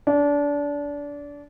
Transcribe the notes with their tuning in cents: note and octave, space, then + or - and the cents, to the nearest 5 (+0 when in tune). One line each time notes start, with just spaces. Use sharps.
D4 -25